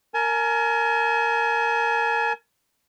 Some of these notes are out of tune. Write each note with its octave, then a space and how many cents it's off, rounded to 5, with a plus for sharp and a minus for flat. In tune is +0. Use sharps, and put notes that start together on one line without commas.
A#4 -10 G#5 +35